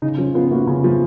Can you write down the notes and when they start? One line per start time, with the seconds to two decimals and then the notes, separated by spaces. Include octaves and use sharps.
0.02 C#3 D#4
0.18 F3 C#4
0.35 B3 F4
0.51 A#3 F#4
0.67 C#3
0.84 F3